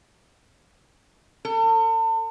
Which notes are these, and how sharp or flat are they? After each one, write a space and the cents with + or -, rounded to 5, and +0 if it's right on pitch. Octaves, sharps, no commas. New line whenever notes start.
A4 +40